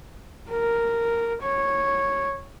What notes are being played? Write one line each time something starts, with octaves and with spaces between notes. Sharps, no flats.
A#4
C#5